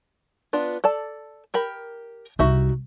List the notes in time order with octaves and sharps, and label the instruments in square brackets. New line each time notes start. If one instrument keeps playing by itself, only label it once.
[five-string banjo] B3 D4 F4
A4 D5 A5
G4 A#4 B5
[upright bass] C2 [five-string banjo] D#4 F#4 E5